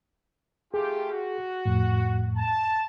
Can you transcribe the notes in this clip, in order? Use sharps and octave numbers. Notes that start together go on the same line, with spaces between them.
A3 F4 G4 G#4
F#4
F2 A2
A5